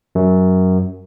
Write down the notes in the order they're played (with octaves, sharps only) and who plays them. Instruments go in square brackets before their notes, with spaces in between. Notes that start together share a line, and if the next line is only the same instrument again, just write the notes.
[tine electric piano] F#2